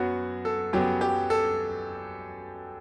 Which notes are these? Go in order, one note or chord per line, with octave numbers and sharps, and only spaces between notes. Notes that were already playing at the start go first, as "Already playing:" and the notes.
Already playing: F#2 F#3 B3 F#4
A4
F#2 F#3 B3 G4
G4
A4